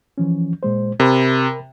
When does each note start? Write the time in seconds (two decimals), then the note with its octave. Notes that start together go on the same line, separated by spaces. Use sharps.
0.18 E3 F3 C#4
0.63 A#2 G#3 C5
1.00 C3 A#4 B5